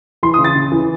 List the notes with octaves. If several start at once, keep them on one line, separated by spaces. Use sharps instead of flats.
E3 C6
C#3 D#6
A6
C#3
E3